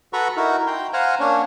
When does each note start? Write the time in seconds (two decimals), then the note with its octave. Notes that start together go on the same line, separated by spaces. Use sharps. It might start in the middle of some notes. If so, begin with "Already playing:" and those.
0.13 F#4 A4 B4 A#5 B5 C#6
0.36 D#4 E4 F#4 A#4
0.67 G5 A#5 C6
0.93 C5 F5 F#5 G#5 A#5
1.20 A#3 C#4 D4 C#5